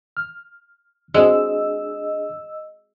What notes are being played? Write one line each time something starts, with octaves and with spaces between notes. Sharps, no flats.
F6
G#3 C4 D4 F#4 G#4 C5 D#5 E6